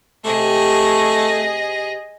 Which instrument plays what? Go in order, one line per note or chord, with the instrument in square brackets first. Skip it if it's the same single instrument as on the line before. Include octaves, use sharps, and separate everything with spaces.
[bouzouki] C3 G4 [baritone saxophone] A3 [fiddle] G#4 D#5